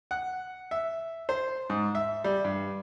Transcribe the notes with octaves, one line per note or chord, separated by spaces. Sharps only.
F#5
E5
C5
G#2
E5
G3
G2